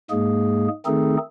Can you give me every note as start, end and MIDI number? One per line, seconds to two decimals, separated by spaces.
0.10 0.68 44
0.10 0.68 56
0.10 0.68 58
0.10 0.68 68
0.86 1.17 51
0.86 1.17 57
0.86 1.17 60
0.86 1.17 63
0.86 1.17 68
0.86 1.17 69